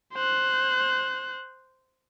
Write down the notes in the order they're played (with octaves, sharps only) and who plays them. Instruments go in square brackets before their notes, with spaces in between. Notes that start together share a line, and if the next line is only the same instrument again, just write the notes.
[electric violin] C5 F#6